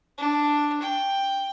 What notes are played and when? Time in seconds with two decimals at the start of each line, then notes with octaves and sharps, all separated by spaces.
0.18 D4
0.82 G5